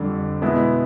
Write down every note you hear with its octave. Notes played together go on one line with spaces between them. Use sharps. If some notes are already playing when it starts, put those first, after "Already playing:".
Already playing: F2 D3 G3
B2 G#3 B3 E4